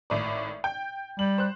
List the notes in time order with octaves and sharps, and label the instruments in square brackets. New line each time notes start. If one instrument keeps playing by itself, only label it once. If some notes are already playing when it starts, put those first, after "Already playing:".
[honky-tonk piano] G#1 A2 D5
G5 G6
[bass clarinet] G3 [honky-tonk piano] F#7
[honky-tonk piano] C5 F#6